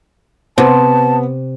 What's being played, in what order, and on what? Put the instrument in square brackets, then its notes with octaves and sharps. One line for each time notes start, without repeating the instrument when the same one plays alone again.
[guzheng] C3 [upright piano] B3 [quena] A5